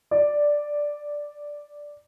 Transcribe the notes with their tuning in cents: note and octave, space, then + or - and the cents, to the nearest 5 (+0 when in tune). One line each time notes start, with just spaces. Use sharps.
D5 +0